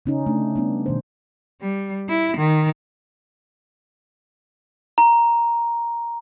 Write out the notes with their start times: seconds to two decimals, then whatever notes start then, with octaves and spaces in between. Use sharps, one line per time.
0.06 C#3 C#4 D#4
0.27 A3 D4
0.56 G3 B3 D4
0.86 B2 D#3 C5
1.61 G3
2.09 E4
2.37 D#3
4.98 A#5